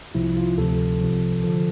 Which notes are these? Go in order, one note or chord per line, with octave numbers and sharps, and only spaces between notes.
C2 C3 F3 E4
F4
D2 C3 F3 A4
C2 C3 F3
D3 F3 A4